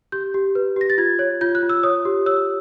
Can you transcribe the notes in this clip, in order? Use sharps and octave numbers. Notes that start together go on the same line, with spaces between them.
G4 G6
G4
B4
G4 A#6
A6
F4 G#6
C#5
F4 G6
F#6
F4
E6
C#5 D#6
G4
C#5 E6